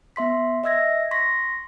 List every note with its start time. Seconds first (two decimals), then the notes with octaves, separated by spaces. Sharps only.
0.16 B3 E5 C6 B6
0.64 D#5 E5 E6 G#6 A#6
1.11 C6 C#6 A#6 B6